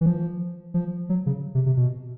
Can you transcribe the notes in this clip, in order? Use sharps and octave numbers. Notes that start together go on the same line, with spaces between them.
E3
F3
F3
F#3
C#3
C3
C3
B2